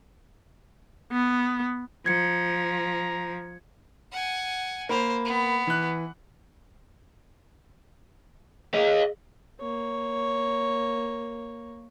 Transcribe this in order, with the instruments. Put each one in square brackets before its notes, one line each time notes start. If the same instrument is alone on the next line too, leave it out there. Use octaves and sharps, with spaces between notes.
[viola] B3
[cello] F3 [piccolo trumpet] A#5 [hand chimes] G#6 C#7
[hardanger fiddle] F#5 G#5
[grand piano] A#3 B5 F7 [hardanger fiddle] C5
[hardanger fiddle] B3
[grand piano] E3 F#6
[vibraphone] G#4 [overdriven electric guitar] D#5 F5
[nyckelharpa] A#3 C#5